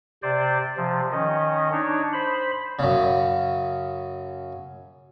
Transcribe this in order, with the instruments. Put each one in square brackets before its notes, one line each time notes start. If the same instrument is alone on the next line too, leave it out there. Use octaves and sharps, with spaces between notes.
[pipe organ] C3 C5 D5
C3 F3
D#3 C#4 D#5
D4 D#4 C#5
C5 B5
[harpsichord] F#2 C#3